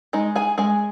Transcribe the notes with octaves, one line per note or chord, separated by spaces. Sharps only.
G#3 D#4 D#5
G#4 G#5
G#3 G#4 G#5